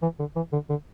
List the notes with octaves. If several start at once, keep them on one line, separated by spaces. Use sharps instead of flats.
E3
D3
E3
D3
D3